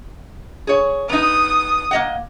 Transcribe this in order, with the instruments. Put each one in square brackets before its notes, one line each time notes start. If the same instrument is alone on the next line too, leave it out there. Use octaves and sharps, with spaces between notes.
[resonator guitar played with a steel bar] G#4 C#5
[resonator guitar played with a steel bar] B3 D#4 [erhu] D#6
[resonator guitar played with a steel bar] A#3 D#5 F#5